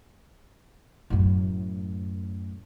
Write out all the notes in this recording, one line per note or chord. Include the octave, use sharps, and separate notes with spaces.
F#2 A2